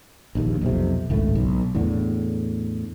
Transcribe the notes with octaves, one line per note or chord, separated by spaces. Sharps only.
A#1 D#2
B1 F2 C3
G#1 C#2 A2 A3
B1
E2 A2 D3